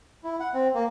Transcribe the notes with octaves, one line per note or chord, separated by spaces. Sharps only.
E4
F#5
C4
A#3